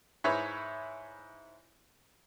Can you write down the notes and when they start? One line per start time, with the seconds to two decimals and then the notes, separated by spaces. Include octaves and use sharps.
0.24 G#2 E4 B4 C#5